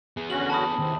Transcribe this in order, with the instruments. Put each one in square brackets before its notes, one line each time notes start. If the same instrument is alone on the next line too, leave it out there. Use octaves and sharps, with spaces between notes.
[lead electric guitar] B3 G#4
[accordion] D3 C#4 F#4 [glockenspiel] F#7
[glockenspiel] A5 B5 D#6
[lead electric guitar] D#2 [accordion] C3 E3 C4